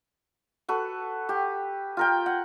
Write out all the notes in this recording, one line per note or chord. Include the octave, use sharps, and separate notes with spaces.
F#4 A4 B4
G4
F4 A#4 G5
F#5